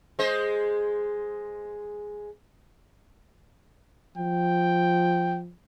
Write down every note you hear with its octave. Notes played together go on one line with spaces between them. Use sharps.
G#3 C5 D#5
F3 G5